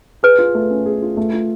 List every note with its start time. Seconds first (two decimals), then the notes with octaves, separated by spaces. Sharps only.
0.23 G#4 B4
0.39 F4
0.55 A3
0.70 C#4
0.86 G#4
1.02 F4
1.17 A3
1.33 F4